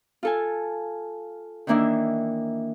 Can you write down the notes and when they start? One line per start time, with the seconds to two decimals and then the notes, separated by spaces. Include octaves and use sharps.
0.23 F4 A4 G#5
1.67 D#3 E3 A#3 D4 E4